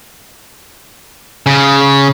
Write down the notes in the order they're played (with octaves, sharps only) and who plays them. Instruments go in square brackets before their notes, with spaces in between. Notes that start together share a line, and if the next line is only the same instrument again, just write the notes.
[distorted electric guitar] C#3